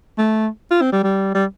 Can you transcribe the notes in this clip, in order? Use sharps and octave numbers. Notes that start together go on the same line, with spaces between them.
A3
F4
C4
G3
G3
G3